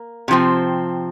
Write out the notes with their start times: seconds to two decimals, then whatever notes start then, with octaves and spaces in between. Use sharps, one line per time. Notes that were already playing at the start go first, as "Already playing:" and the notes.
Already playing: A#3
0.28 C3 F3 C4